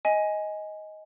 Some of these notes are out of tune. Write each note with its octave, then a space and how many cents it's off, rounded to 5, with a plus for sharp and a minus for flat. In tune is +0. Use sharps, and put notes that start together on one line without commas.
D#5 +10 G#5 +0